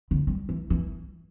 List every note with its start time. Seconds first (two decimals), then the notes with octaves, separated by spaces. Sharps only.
0.11 D3
0.27 G3
0.49 E3
0.70 E3